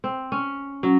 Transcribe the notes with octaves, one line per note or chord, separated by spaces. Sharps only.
C4
C#4
F#3 C#4